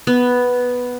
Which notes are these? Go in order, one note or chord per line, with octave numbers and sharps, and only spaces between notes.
B3